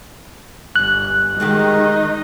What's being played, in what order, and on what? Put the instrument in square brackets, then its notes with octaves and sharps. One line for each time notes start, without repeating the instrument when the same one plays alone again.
[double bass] G1 [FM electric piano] F#6
[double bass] D#3 [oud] G#3 F#4 G4 [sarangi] D#4